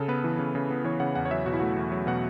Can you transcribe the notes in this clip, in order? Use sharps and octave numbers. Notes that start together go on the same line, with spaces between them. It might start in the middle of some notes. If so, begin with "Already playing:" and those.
Already playing: C#3 A4
B3 B4
E3
C#3
C#3
B3
E3 C#5
C#3 F#5
E2 F#5
C#5
F#3 E5
B2 F#4
E4
A3 F#4
E2
F#3
B2 F#5